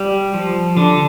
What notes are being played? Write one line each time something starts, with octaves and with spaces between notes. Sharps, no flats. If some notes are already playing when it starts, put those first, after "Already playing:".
Already playing: G3
F3
D3 D4